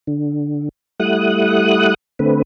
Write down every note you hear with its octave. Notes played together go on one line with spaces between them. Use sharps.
D3
G3 A3 E4 F#5 D#6 F#6
D3 A3 C4 B4